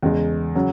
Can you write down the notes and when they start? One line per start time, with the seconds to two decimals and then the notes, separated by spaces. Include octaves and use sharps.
0.03 E2 C#3 G#3
0.55 C#3 F#3